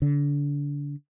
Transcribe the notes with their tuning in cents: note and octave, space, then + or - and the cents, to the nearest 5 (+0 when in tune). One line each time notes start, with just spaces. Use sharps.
D3 -30